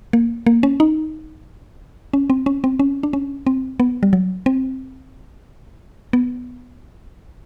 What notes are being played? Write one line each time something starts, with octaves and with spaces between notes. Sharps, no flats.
A#3
A#3
C#4
D#4
C#4
C4
C#4
C4
C#4
D4
C#4
C4
B3
G3
F#3
C4
B3